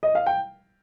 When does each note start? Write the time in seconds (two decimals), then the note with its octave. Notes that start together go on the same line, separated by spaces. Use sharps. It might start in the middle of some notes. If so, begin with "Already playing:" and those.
0.03 D#5
0.15 F5
0.26 G5